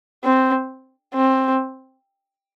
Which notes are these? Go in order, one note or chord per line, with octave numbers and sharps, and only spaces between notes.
C4
C4